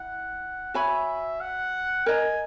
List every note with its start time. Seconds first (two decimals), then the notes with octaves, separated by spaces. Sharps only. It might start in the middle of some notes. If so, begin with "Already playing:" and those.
Already playing: E4 F#5
0.74 F#4 C#5 E5 G#5 B5
1.41 F#5
2.06 A#4 D#5 G#5 A#5